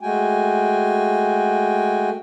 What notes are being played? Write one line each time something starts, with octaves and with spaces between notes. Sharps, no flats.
G#3 A3 F#4 G5 G#5